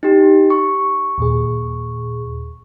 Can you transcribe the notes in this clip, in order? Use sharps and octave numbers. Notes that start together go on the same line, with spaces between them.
D#4 G4
C#6
D#2 A#2 G#4